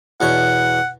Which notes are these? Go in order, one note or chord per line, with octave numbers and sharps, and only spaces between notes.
E2 B2 C#5 F#5